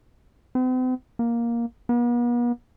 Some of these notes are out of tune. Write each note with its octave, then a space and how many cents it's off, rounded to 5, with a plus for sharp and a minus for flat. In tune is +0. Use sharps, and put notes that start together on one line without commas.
C4 -45
A#3 +10
B3 -45